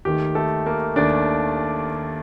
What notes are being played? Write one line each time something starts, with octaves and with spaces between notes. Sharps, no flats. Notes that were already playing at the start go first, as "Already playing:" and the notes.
D#2 D#3 A3 G4
A3 A4
A#3 A#4
D#2 D#3 A3 D4 D5